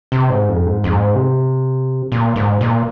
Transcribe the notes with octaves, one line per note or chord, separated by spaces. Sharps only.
C3
G#2
F2
G#2
F2
G#2
C3
A#2
G#2
A#2